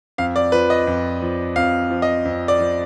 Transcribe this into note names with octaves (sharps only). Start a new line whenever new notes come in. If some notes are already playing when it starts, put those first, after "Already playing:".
F2 F5
D5
F3 B4
D#5
F2
F3
F2 F5
F3
D#5
F2
D5
F3